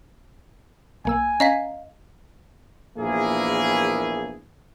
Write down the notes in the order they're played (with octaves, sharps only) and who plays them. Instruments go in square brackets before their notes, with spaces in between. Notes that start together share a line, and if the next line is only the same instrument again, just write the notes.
[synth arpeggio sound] B1 A#3 E6 [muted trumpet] G#5
[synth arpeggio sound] C#4 A#5 [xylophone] D#5 F5 B6
[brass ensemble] A#1 E2 A#3 E4 G#4